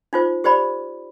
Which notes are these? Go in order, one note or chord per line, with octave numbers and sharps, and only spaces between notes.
D#4 F4 C5
G4 C5 D5 B5